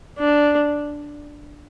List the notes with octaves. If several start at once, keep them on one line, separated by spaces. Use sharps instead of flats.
D4